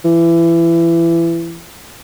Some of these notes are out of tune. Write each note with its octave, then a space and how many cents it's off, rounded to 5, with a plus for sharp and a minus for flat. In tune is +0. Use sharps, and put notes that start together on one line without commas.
E3 +25